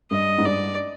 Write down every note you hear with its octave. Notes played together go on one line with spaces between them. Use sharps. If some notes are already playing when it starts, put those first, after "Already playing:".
G2 D#5
G#2
G2 D5